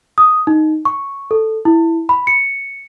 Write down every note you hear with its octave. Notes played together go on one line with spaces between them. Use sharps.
D#6
D#4
C#6
A4
E4
B5
C#7